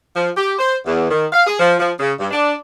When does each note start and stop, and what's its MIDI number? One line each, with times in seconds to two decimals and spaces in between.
0.16 0.30 53
0.36 0.53 67
0.59 0.75 72
0.86 1.09 40
1.11 1.26 51
1.33 1.44 77
1.47 1.55 68
1.59 1.75 53
1.79 1.92 53
1.99 2.13 49
2.19 2.27 43
2.31 2.54 62